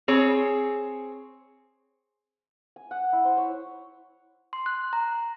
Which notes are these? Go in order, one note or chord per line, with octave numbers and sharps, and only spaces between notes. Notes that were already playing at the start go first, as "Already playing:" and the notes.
C4 G#4 C#5
G#5
F#5
E4
C5
C#5
C6
F#6
A#5